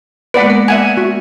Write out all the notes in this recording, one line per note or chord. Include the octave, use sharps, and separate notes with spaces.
G#3 A#3 B3 B4 D5 F#5
A#4
E5 F#5 G#5
F#4